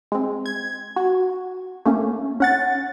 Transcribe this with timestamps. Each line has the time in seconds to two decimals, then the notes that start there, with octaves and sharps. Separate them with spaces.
0.12 G#3 C4
0.46 G#6
0.96 F#4
1.85 A3 A#3 C#4
2.40 C#4 F#5 A6